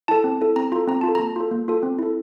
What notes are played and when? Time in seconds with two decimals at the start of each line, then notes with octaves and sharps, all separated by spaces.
0.08 E4 A4 A5
0.24 C4
0.41 E4 A4
0.56 C4 A#5
0.72 F4 A4 A#5
0.87 C4 A#5
1.01 F4 A5
1.09 A4
1.15 A#3 A#5
1.36 F4 A4
1.51 A#3
1.68 F4 A4
1.83 C4
1.99 E4 A4